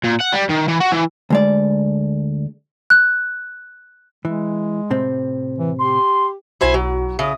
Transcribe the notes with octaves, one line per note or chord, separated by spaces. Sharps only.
A#2
F#5
G3
D#3
E3
F#4
E3
D2 G#3 D5
F#6
E3 G#3
A2 C3 C4
E3
G4 C6
B1 E4 F#4 C5 G#5
F#3
C#3 E5 D#6